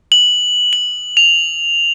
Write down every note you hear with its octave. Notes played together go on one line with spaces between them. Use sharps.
F#7
F#7
F7